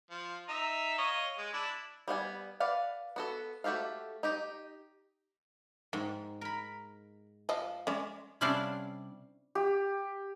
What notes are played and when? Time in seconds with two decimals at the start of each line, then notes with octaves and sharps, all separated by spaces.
0.11 F3
0.49 D#4 E5 A#5
0.98 C#5 D#5 F5
1.38 G#3
1.53 D4 E4
2.08 G3 B3 F5 G#5
2.60 B4 D5 F5 F#5
3.16 B3 F#4 A4
3.64 A3 F#4 G4 A4 F5
4.23 D#4 G4 D#5
5.93 G#2 D#3
6.41 A#4 B5
7.49 F3 D#5
7.87 G#3 C#4 D5
8.41 C3 G3 C#4 D4 E4 F5
9.55 G4